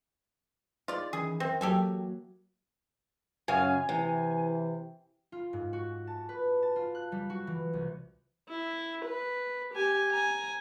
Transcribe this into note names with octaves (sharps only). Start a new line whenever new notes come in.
D#4 F4 G#4 D5
D#3 E3 C#4 G#4
C4 A#4 D#5 E5
F#3 A#3 F#4 G4 A4 G#5
F#2 C#3 F5 G#5
C3 E3
F4
G#2
F#4
A5
B4
A5
F4
F#6
G3
F#4
E3
C2
E4
B4
G4 G#5
G#5 A#5